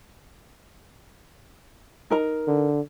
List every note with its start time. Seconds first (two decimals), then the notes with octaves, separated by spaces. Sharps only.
2.10 D#4 A#4 A#5
2.47 D3